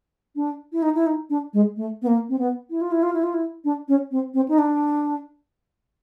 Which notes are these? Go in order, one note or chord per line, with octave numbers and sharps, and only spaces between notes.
D4
E4
D#4
E4
D#4
D4
G#3
A3
B3
A#3
C4
B3
E4
F4
E4
F4
E4
F4
E4
D4
C#4
C4
C4
D#4
D4